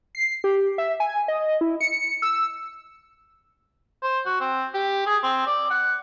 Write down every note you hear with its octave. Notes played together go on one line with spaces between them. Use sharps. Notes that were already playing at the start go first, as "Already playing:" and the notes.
C7
G4
E5
G#5
D#5
E4
C#7
E6
C5
F#4
C4
G4
G#4
C4
D5
F#5